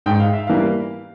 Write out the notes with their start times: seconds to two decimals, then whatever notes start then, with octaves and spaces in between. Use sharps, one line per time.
0.06 G#2 G5
0.20 F5
0.33 E5
0.47 E3 G3 A#3 F5